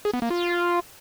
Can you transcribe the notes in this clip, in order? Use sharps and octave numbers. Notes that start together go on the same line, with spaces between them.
G#4
B3
A#3
F4